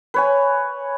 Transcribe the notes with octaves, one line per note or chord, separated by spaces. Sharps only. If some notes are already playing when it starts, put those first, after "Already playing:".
B4 C#5 G#5